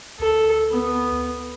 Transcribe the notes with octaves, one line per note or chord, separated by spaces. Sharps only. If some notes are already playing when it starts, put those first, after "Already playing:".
D2 A4
B3